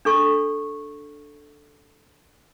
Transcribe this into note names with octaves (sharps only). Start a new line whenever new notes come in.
D4 A4 C#6